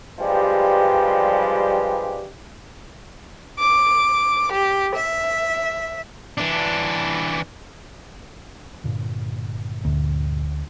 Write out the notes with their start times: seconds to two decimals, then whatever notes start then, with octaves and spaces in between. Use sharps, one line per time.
0.20 G2 F3 G3 G#3 G4 B4
3.60 D6
4.53 G4
4.96 E5
6.38 E3 D4
8.84 G2 A#2 D3
9.85 D2